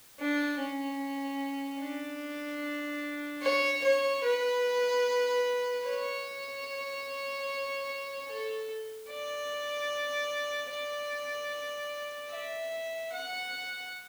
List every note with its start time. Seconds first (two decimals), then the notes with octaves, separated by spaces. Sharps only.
0.19 D4
0.60 C#4
1.80 D4
3.42 C#5
3.84 C#5
4.24 B4
5.86 C#5
8.28 A4
9.09 D5
10.70 D5
12.31 E5
13.12 F#5